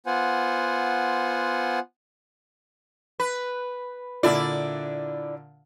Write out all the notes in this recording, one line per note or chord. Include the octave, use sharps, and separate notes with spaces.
B3 F4 C5 F#5 G#5
B4
A#2 D3 D4 E4 D5